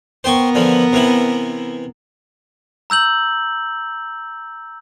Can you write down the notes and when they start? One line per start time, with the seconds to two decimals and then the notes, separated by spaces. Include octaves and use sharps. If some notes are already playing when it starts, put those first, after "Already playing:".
0.24 B3 A#4 C5 G5 C#6
0.55 D3 E3 F3
0.93 C3 E3 E4
2.90 A#5 E6 G6 F#7